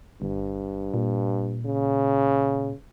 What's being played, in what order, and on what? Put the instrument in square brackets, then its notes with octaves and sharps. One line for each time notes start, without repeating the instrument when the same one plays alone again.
[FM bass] G1 [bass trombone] G2
[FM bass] A#2
[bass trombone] C#3